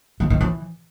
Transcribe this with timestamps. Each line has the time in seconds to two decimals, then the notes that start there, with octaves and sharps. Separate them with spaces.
0.20 D#3
0.30 D#3
0.41 E3